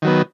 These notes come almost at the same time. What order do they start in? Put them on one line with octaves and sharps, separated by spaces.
D#3 F#3 B3